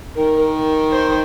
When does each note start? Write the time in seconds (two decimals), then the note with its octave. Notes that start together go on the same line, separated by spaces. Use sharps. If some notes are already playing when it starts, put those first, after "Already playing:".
0.15 D#3 A#4
0.91 C5